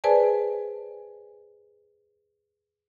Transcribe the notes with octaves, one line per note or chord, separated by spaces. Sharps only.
G#4 B4 C5 D5 G#5 A5